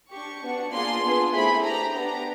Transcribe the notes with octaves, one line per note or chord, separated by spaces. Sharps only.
D4 G4 C#6
B3 D4 F#4
A#3 D4 F4 G#4 C6
B3 D4 F4 G#4
A3 C4 E4 G#4 B5
D4 G4 A#5
B3 D4 G4 A#5